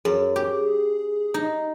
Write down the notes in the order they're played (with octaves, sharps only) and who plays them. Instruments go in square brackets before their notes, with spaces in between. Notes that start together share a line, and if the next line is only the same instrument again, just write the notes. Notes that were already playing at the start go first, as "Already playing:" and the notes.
[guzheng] F#2 [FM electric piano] G#4
[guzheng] G4
D#4